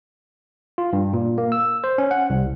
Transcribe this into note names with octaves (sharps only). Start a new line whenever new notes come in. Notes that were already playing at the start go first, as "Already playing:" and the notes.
F4
G2
A#2
A#3
E6
C5
C#4
F#5
C2